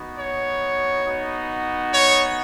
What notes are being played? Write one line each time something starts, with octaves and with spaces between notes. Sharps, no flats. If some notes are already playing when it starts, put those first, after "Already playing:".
Already playing: B3 D#4 F#4
C#5
B3 D#4 F#4
C#5